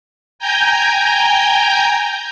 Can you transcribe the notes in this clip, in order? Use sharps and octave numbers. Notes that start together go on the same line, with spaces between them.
G5 G#5 A#5 G6